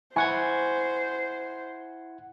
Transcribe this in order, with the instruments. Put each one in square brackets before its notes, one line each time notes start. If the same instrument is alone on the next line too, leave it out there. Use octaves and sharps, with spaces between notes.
[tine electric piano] E4 F#5 G#6 [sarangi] C5 [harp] G#5 C#6